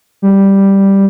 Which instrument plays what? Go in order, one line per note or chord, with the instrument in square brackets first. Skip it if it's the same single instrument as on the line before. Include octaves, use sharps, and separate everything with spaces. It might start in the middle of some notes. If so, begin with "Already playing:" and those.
[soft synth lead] G3